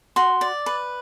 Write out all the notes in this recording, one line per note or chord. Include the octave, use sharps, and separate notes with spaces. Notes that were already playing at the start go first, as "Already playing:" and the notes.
F#4 C6
D5
B4